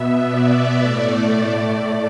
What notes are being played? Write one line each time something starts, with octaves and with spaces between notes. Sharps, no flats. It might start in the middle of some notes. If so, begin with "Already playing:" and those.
Already playing: B2 B3 E5
D5
A2 A3